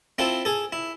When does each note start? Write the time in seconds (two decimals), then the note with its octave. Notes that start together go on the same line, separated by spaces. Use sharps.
0.18 C4 E4 F4 A4
0.45 G#4 A4
0.72 E4